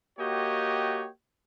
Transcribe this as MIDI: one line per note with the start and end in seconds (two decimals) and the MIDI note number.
0.19 1.07 58
0.19 1.07 66
0.19 1.07 67
0.19 1.07 73
0.19 1.07 75
0.19 1.07 79